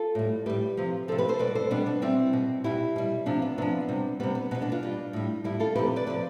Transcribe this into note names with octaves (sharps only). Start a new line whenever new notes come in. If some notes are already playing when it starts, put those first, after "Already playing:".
Already playing: F4 A4
A2 G3
A2 G3 G4 B4
C3 F3
C3 F3 F4 A4
G4 B4
A4 C5
B2 G3 B4 D5
A4 C5
B2 G3 B3 D4
B3 D4
B2 G3 C4 E4
B2 G3
B2 G3 E4 G4
B2 G3
C3 F3 D4 F4
B3 D4
C3 F3 B3 D4
C3 G3
C3 G3 B3
B3
B2 G3 B3
B3 D4
D4 F4
B2 G3
A2 G3
A2 G3 E4 G4
F4 A4
C3 F3 G4 B4
B4 D5
C3 F3 B4 D5